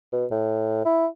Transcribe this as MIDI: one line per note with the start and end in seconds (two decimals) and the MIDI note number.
0.13 0.26 47
0.31 0.85 45
0.85 1.07 64